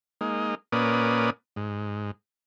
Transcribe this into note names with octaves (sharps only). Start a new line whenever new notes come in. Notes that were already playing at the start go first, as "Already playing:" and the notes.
G#3 A#3 D#4
A#2 A#3 C#4 B4 D5 D#6
G#2